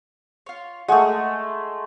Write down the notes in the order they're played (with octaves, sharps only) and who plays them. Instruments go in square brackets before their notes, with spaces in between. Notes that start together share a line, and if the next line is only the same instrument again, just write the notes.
[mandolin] F4 C#5
[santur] G#3 A3 [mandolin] F#5 C#6 D#6